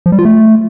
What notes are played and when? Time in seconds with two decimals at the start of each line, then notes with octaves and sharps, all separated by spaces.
0.06 F3
0.12 G3
0.19 F4
0.25 A3